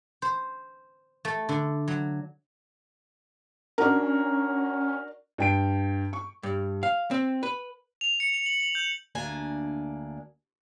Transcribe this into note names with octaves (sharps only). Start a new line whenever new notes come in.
C5
A3
D3
F#3
C#4 D4 F#4 A#4
G2 G5 D7
C#6
G2
F5
C4
B4
F7
C#7
F7
F#7
F#7
G6
D2 A#3 D4 G#5